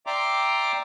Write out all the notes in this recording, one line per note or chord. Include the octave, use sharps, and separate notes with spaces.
D5 E5 G5 A#5 C6 D6